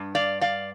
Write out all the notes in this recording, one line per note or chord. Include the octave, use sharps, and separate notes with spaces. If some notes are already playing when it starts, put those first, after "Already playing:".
Already playing: G2
D5 F5
D5 F5